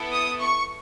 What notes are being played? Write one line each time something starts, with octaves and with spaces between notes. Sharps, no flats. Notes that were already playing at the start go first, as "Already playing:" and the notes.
Already playing: B3 E4 A4
D#6
C#6